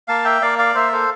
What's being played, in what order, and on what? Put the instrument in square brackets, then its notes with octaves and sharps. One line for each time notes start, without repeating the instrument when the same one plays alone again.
[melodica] A#3 F5 A5
E5 G5
A#3 D5 F5
D5 F5
A#3 C5 E5
A4 C5